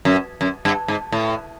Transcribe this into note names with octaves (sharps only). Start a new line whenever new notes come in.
F#2
F#2
G2
G#2
A2